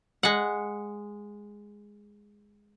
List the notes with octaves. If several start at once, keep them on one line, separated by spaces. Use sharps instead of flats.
G#3 F#5